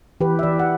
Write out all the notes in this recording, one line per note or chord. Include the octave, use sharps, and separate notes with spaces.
E3 G4 B4
E5
E3 B4 D5
F#5